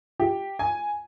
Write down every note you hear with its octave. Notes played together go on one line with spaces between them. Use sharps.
G4
G#5